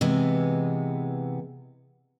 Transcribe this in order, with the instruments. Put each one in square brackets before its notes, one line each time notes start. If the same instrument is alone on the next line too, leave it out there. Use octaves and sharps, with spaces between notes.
[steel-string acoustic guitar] C3 E3 G#3 B3